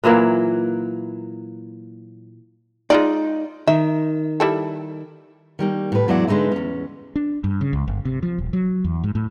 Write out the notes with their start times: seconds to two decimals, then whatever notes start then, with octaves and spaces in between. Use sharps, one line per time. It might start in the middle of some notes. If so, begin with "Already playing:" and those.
0.04 A#2 E3 F#3 A#3
2.90 G#3 D#4 F4 D5
3.67 D#3 E5
4.40 G3 E4 A4
5.59 D#3 G3 A#3
5.92 A2 B4
6.08 E2 F#3 G#3 E4 D5 F#5
6.27 D3 G#3 D#4 B4 E5
6.52 E2 C#4
7.16 D4
7.44 G2
7.61 C#3
7.73 C#2
7.88 G1
8.05 C3
8.23 F3
8.38 D#1
8.53 F#3
8.84 E2
9.04 G#2
9.15 A2